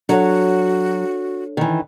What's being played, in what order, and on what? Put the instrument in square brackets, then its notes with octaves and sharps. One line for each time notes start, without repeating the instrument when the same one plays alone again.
[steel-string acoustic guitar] F#3 [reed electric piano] D4 A4 C#5 [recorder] F#4
[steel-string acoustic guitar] D#3 E3